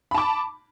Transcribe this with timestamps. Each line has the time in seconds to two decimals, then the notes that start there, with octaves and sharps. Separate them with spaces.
0.11 B5
0.14 A5
0.18 D6